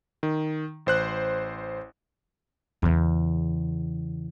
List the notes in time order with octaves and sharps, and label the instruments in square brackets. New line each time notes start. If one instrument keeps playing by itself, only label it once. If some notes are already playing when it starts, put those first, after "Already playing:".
[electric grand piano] D#3
A1 C5 F#6
[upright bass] E2 C#3